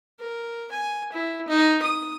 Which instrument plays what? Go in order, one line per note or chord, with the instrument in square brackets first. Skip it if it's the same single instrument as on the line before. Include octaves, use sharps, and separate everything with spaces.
[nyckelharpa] A#4
G#5
E4
D#4
D#6